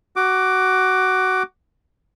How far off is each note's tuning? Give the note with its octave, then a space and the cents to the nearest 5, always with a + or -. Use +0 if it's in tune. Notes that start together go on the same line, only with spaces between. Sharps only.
F#4 +15 D6 +5